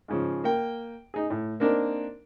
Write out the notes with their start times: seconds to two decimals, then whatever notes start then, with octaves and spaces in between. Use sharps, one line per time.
0.08 G#2 C#3 F3
0.44 A#3 G5
1.14 D#4 G#4
1.30 A2
1.60 A#3 C4 D4 D#4 A#4